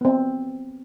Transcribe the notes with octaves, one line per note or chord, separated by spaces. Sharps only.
B3 C4